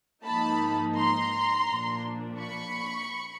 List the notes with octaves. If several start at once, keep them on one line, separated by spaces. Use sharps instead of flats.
G#2 F3 A#3 D#4 A5 B5
A#5 C6
A#2 F3 A#3 D4
B5 C#6